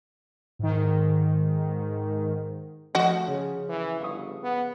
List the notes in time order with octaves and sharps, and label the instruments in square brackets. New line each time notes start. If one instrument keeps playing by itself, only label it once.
[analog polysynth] G#2 D#3
[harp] F3 [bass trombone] A3 [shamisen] F#4 D#5
[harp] C#3 [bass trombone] C#4
[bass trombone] E3
[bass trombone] G1 [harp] F5 C#6 D#6
[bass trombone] B3